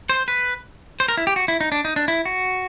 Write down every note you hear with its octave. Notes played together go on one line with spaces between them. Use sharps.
C5
B4
C5
A#4
E4
G4
F#4
E4
D#4
D4
D#4
D4
E4
F#4